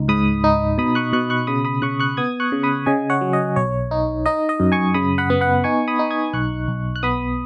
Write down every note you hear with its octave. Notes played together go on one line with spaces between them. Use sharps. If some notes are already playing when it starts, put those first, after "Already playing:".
Already playing: C#2 D#4
G#2 B5 D#6
D#4
B2 B5 D#6
C#6 F#6
B2 C#6 F#6
C#6 F#6
C#3 B5 D#6
B5 D#6
C#3 C#6 F#6
C#6 F#6
B3 D#6 G#6
C#6 F#6
C#3
B5 D#6
C#3 D#5 G#5
C#5 F#5
F#3
D#5
B1 C#5
D#4
D#4 D#5
D#5
F#2
G#5 C#6
C#3 B5 D#6
F#5 B5
B3
F#5 B5
D#4 G#5 C#6
B5 D#6
D#4
D#6 G#6
B1 C#6 F#6
B1
F#6
B3 B5 D#6